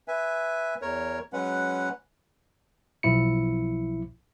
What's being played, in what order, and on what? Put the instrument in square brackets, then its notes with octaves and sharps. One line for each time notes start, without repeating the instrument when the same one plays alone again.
[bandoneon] B4 E5 G#5
E2 A#4 C#5
F#3 G#3 C#4 B4 F#5
[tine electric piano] B1 F3 E4 C#7